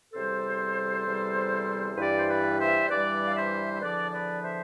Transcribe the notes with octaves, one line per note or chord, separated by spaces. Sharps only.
E2 C3 G3 A4 C5
E2 C3 G3
G2 E3 G3 B4 D5
C5
B4 D5
C5 E5
G2 E3 G3 B4 D5
F5
C5 E5
E5
E2 D3 F3 B4 D5
B4 D5
C5 E5